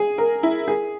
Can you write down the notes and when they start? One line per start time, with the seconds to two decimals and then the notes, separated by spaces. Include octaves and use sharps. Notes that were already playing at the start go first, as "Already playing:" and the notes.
Already playing: G#4
0.18 A#4
0.43 E4
0.68 G#4